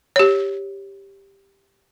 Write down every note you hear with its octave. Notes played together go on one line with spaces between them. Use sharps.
G4 C#5